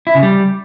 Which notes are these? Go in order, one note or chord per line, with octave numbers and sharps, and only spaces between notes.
E4
C#3
G3